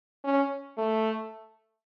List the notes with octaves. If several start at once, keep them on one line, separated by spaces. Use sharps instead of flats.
C#4
A3